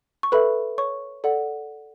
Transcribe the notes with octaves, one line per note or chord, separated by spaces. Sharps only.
C#6
A4 B4 E5 B5
C#5 C#6
A4 D5 F#5